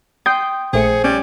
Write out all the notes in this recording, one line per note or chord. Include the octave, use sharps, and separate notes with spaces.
G5 C6 D#6 G6
A#1 A3 G#4 C5 C#7
G3 C#4